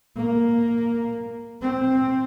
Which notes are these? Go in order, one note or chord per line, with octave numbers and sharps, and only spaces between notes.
A#3
C4